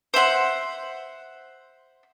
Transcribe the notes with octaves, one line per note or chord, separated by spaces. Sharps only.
C5 E5 F#5 C6